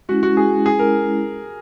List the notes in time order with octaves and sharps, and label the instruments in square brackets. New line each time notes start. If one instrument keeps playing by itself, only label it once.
[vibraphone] G#3 C#4 E4 [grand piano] F#4
[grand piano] F#4
G#4
G#4
A#4